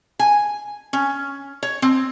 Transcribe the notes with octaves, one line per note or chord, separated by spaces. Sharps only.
G#5
C#4
C#5
C4